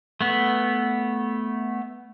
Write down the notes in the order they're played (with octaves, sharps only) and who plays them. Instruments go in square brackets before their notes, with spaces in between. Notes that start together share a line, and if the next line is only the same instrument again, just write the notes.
[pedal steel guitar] A3 B3